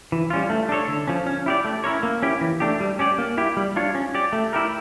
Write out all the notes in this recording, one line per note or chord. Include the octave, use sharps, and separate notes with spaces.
E3
G3 C#4 F4
A3
D4 A4 C#5
D3
F3 C#4
C#4
E4 G4 D5
A3
C#4 E4 A#4 C#5
A#3
C#4 E4 G4
E3
A3 D4 G4
G3
C#4 G4 D5
A#3
E4 G4
G3
D4 F4 C#5
C#4
G4 D5
A3
E4 G4 A#4